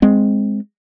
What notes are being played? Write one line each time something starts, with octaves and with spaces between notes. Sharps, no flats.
G#3 C4